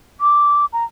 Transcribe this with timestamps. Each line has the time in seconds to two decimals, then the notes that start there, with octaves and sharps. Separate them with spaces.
0.21 D6
0.73 A#5